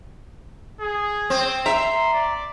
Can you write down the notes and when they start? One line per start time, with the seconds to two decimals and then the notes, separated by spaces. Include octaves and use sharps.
0.80 G#4
1.30 C4
1.66 E5 A#5 C6
2.13 D5